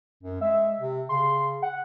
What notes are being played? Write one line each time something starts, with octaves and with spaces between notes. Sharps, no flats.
F#2
G#3 E5
C3
C#3 C6
F#5